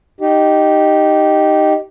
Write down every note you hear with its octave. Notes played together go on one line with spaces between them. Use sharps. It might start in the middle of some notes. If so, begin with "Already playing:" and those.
D#4 G4